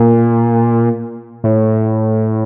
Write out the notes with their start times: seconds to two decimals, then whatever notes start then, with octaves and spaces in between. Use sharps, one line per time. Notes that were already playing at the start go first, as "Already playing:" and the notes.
Already playing: A#2
1.44 A2